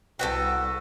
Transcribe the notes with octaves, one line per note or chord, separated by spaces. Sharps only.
C2 F#4 A4 B4 G5